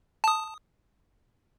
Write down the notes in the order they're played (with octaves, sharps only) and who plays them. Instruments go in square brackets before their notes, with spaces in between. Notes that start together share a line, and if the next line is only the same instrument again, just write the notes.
[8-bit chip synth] A5 D#6